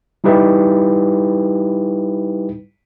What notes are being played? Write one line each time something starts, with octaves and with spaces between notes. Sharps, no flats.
G3 D#4 E4 G4 B4